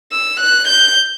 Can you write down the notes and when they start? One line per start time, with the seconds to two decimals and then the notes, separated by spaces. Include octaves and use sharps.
0.12 E6
0.40 F#6
0.68 G6